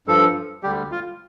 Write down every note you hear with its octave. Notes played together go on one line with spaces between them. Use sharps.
G2 F3 A4
D2 D3 G3 G4
F4